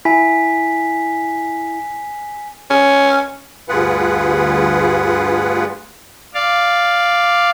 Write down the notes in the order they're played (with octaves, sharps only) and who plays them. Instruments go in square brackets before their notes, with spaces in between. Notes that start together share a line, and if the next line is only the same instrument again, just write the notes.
[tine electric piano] E4 [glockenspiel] G#5 B6
[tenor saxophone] C#4
[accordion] D2 G2 F4 G#4 B4 F#5
[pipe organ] D5 F5